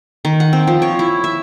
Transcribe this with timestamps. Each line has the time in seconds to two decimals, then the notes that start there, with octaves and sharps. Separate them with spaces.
0.25 D#3
0.40 F#5
0.53 C4
0.67 F3
0.82 C#5
0.99 E4
1.24 E5